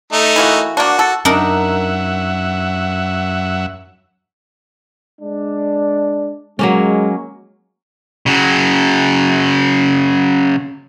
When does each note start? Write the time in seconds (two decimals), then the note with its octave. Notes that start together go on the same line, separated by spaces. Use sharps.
0.12 A3 D#4
0.36 E3 A#3 F#4
0.77 A#3 D4 F#4
0.99 A4
1.25 F#2 D4 D#4 A#4 E5 F#5
5.20 G#3 D4
6.59 F#3 G#3 A#3 C#4
8.26 C#3 F#3